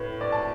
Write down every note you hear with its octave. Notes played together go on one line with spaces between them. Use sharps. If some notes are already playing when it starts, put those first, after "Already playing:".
Already playing: A2 B4
D5
A5